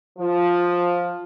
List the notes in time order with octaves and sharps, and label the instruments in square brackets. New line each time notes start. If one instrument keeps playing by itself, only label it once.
[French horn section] F3